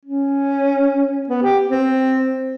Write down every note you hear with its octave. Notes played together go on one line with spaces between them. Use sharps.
C#4
B3
G4
C4